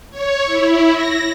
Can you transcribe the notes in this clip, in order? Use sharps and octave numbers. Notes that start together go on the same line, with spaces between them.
C#5
E4
A#6